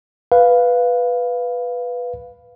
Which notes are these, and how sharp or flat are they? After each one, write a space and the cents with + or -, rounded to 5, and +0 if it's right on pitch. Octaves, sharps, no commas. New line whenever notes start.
B4 +0 F5 +0